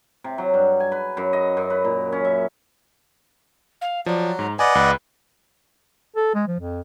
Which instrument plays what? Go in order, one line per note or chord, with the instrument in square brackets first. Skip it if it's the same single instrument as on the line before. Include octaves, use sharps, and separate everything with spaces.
[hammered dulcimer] C3
F#3
G2
G#5
B4
F#2
D#5
F#2
B4
A#2
C#4
E5
[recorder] F5
[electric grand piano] F3 [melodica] F#3 [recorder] D5
[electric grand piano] G#2 [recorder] A#5
[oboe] B4 [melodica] D5 D#5 [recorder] F#5 [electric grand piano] G#5
[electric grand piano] C#2 [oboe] B4
[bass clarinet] A4
G#3
F3
F2